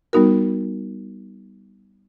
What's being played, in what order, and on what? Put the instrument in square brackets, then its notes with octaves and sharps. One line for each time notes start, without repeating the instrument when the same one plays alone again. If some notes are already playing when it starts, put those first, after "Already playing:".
[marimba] G3 B3 D#4 F#4 A#4